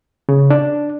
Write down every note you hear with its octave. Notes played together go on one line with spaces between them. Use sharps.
C#3
D4